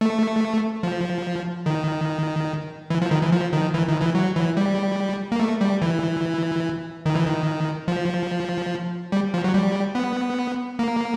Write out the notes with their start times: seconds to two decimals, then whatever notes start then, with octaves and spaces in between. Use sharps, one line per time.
0.01 A3
0.83 F3
1.66 D#3
2.90 E3
3.02 F3
3.11 D#3
3.22 E3
3.32 F3
3.53 D#3
3.74 E3
3.88 D#3
4.01 E3
4.15 F#3
4.36 E3
4.57 G3
5.32 A#3
5.40 A3
5.61 G3
5.82 E3
7.06 D#3
7.15 E3
7.25 D#3
7.88 F3
9.12 G3
9.34 F3
9.44 F#3
9.54 G3
9.95 B3
10.79 A#3